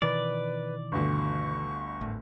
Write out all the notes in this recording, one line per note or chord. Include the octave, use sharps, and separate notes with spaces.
B2 D#3 E3 B4 D5
G1 D2 C#6
G#1 A2